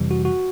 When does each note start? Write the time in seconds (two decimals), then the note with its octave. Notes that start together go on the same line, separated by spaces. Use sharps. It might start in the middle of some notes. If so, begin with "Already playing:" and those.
Already playing: F2 C3 E3 G3
0.11 F#4
0.25 F#4